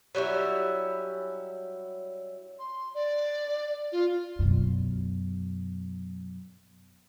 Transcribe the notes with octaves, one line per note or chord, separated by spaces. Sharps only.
F#3 G3 C#4 E4
C6
D5
F4
F#2 B2